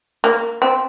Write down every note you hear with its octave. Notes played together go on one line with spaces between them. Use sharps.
A#3
C4